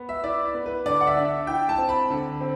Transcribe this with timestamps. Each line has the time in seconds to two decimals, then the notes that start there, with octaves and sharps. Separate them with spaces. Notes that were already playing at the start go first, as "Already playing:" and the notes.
Already playing: B3
0.09 E5
0.23 E4 D5
0.54 B3
0.66 B4
0.86 D3 D5
1.01 F#5
1.07 E5
1.17 D4
1.47 E4 G5
1.69 A5
1.78 C4
1.89 B5
2.10 D3
2.41 C4